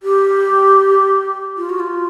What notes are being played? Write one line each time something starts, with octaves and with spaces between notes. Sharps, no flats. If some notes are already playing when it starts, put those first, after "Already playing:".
G4
F4
F#4
F4